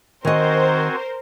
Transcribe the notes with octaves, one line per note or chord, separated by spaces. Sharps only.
D#3 C4 F#4 A#4 C5 D#5 G#5